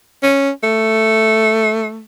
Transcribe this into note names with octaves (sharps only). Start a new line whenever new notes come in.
C#4
A3